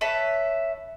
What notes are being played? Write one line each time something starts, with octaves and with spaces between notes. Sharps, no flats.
B4 C#5 E5 A5